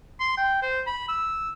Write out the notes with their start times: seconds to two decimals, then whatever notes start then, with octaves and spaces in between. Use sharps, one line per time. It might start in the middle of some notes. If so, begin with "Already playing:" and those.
0.20 C6
0.37 G5
0.63 C5
0.87 B5
1.09 E6